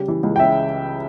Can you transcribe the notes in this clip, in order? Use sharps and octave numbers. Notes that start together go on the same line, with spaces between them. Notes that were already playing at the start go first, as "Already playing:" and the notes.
Already playing: C#3 G3
E3
C#2
G5
C#3 E5